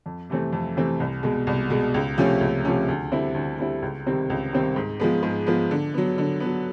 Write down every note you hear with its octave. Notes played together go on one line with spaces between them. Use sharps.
F2
C3 E3 A3 C4
F2
C3 E3 A3 C4
C2
B2 G#3
C2
B2 G#3
C#2
C3 F3 A3 C#4
C#2
C3 F3 A3 C#4
D2
D3 G3 C4 E4
D2
D3 G3 C4 E4
C#2
C3 D#3 G3 C4
C#2
C3 D#3 G3 C4
G#2
F3 G#3 B3
G#2
F3 G#3 B3
D3
F#3 B3
D3
B3
F#3